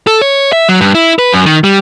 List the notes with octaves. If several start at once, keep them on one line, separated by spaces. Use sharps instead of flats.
A4
C#5
E5
F#3
G2
E4
B4
F#2
D#3
G3